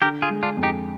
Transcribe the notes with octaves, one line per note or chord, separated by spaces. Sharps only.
D3 G4 A#4
F4 G#4
G#3
D4 F4
F2
D#4 G4